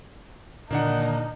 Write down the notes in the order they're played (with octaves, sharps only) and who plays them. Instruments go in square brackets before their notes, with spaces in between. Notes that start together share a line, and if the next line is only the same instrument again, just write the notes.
[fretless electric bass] A#2 D3 D#3 [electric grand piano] A#3 D4 F#5 [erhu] D#4